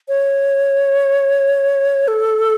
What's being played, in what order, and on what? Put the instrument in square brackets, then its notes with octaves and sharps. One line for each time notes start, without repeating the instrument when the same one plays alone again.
[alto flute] C#5
A4